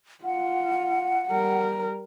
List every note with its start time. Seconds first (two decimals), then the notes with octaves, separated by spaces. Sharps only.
0.24 F4 F#5
1.29 G3 A#4